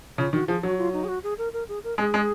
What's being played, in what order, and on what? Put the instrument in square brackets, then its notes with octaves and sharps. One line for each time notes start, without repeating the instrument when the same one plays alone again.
[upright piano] C#3 [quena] F4
[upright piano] D#3 [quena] F#4
[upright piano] F3 [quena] G#4
[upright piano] F#3 [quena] F#4
[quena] F4
D#4
G#4
F#4
G#4
A#4
A#4
G#4
A#4
[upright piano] G#3 [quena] G#4
[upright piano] G#3